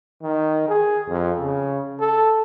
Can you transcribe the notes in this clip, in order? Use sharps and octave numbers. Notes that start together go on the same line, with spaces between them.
D#3
G#4
F2
C#3
A4